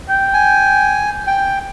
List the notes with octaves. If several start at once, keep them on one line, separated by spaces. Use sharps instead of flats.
G5
G#5
G5